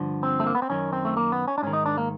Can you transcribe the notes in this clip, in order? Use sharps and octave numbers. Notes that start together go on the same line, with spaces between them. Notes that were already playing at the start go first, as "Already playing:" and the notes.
Already playing: G2 D3 F3
C4
A3
A#3
B3
C4
F#2 D#3 C#4
C4
A3
A#3
B3
C#4
D4
G#2 D#3 C#4
D#4
D4
A#3